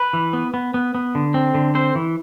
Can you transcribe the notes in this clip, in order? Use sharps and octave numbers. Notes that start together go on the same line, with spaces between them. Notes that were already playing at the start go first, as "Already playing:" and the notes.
Already playing: B4
E3
B3
B3
B3
B3
D3
C4
D3
C4 C5
E3